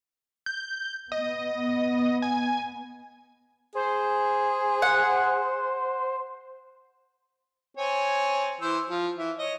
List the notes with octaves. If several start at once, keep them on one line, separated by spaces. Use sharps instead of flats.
G6
B3 D#5
G#5
G#4 C5
F#5
C4 C#5 G#5
E3 C5 E6
F3
E3 E5
C#5 D#5